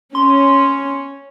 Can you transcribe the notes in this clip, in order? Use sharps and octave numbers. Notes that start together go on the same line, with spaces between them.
C#4 C6